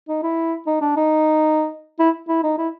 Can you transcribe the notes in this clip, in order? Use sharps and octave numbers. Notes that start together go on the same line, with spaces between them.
D#4
E4
D#4
D4
D#4
E4
E4
D#4
E4